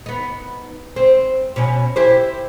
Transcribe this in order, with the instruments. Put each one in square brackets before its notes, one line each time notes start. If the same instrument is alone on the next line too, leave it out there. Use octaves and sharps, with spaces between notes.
[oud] B3 D#4
C4
B2 C#4
E4 G4 C5